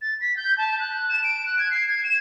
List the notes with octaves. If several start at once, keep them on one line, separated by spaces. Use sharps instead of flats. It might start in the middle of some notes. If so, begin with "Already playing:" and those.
A6
B6
G6
A5
F#6
E7
D7
F#6
G#6
C7
G#6
E7